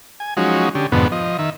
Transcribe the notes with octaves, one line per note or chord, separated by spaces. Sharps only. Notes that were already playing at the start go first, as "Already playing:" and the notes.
G#5
F3 F#3 G#3 C#4 D#4 F#4
D3 C#4 G4
F2 G#2 B2 D3 B3
F3 D#5
D#3 E5